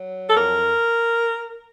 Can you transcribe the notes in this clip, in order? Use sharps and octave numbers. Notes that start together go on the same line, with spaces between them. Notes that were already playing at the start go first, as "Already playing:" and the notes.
Already playing: F#3
A4
F2 A#4